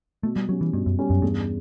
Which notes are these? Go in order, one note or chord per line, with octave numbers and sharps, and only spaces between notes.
B2 A3
G3
F#3 G3 C#4
E3
G2 B2
F#2
G3 C#4
F#2
E2 G2